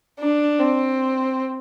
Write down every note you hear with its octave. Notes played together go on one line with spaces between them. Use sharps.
D4
C4